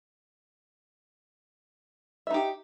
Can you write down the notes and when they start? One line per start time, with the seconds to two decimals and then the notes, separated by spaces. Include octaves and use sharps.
2.27 E5
2.31 D#4
2.34 G4